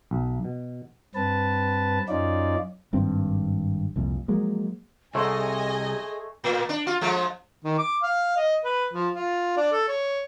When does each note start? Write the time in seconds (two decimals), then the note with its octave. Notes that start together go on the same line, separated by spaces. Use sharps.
0.11 B1
0.44 B2
1.15 G2 C4 B4 A5
2.09 F#2 C#4 D#4 F4 D5
2.93 G#1 G2 C4
3.96 C2 F2 A#2
4.28 F3 F#3 G#3 A#3
5.15 C2 A3 G#4 C#5 D#5 G#5 C6
6.44 A2
6.69 D4
6.87 F4
7.01 F3 G#3 A3
7.64 D#3
7.78 D6
8.03 F5
8.37 D#5
8.64 B4
8.93 F3
9.14 F4
9.57 D4
9.72 A4
9.88 C#5